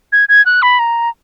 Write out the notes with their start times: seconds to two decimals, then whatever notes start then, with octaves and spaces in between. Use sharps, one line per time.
0.12 G#6
0.29 G#6
0.46 F#6
0.62 B5
0.79 A#5